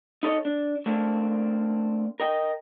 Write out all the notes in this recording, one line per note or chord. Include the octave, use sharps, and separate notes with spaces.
D#4 E4 A4 A#4 C#5 D#5
D4
A3 A#3 C4 D4
A#4 D#5 G5